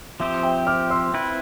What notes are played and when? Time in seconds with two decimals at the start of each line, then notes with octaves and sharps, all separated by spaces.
0.20 F3 C4 G4 C5 E5
0.43 E5 G5
0.67 D6 F6
0.90 C6 E6
1.14 C4 E4 B4